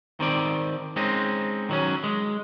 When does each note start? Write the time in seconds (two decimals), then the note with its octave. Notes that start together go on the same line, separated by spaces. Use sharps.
0.20 D#3 C4 D5
0.96 G#3 C4 C#4 D#4
1.69 D#3 F#3 C#4
2.04 G#3